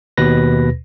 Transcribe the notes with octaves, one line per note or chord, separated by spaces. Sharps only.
D#2 B2 B4 A#6